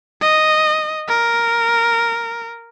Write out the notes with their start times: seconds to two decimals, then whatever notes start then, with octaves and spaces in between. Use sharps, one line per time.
0.21 D#5
1.08 A#4